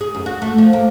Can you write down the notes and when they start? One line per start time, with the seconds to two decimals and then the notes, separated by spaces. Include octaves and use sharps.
0.01 G#4
0.15 F#2
0.26 F#4
0.42 A3
0.58 F3
0.73 A#3